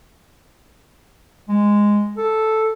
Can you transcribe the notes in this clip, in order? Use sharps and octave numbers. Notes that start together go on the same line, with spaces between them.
G#3
A4